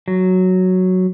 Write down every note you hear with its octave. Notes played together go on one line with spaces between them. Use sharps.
F#3